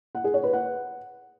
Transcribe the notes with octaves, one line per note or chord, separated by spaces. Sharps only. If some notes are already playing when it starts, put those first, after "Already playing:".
F#5
G#4
C#5
B4
F#5